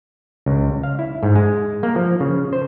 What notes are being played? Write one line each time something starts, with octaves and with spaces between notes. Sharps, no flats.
C#2
F5
E4
G#2
G#3
A#3
F3
C#3
C5